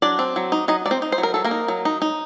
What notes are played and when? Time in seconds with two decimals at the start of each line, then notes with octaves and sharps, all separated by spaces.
0.02 F#3 D4 D5
0.19 C4
0.36 F#3
0.52 D#4
0.68 F#3 D#4 D#5
0.86 F#3 D5
0.91 C4 C5
1.02 D#4
1.12 C5
1.18 F#3
1.23 A#4
1.34 F#3 A4
1.45 A#3 A#4
1.51 D#4
1.68 F#3
1.85 D#4
2.02 D#4